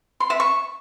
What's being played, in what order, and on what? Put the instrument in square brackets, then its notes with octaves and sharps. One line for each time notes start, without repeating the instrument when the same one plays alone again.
[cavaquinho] C6
E5
C#6